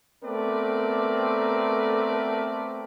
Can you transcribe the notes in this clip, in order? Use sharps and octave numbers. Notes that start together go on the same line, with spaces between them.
A3 B3 C4 A#4 B4 D5